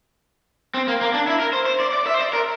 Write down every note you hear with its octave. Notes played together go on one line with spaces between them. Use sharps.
C4
A#3
A#3
D4
E4
A#4
C5
C5
D5
D5
E5
C5
D5
A#4